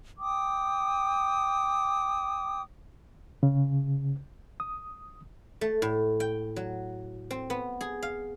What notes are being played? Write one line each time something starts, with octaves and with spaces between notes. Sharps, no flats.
G5 D6 D#6
C#3
D#6
A3
A2
G5
F#3
C4
B3
G#4
F5